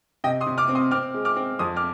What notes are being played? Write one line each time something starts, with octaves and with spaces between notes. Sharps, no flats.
C3 D#5 G5
C6 D#6
C3
D6 F6
C4
C6 D#6
C4 D6 F6
G#3
D6 F6
C4
F2 C6 D#6
D6 F6